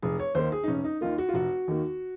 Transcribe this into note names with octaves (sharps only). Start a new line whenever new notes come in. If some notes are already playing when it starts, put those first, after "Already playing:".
F1 G#4
C#5
D#2 D#3 A#3 C5
G#4
D#4
F1 C#4
D#4
D#2 D#3 A#3 F4
F#4
F4
F1 F#4
D#2 D#3 A#3